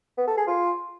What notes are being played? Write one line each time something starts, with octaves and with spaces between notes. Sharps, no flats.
B3
A4
G#4
F4